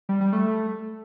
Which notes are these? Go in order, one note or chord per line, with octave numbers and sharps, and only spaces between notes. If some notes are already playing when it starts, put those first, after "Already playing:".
G3
G3
A3